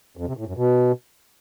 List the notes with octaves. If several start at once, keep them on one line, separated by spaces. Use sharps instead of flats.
F2
C3
A2
F#2
B2